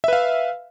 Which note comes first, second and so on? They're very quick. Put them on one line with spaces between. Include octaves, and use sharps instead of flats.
E5 B4 F5